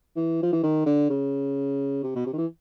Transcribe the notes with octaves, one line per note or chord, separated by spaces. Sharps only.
E3
F3
E3
D#3
D3
C#3
C3
B2
C3
D#3
E3